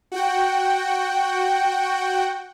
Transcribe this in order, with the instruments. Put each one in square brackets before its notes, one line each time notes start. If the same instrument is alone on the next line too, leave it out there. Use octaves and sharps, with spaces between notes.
[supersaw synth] F#4 F#5 G5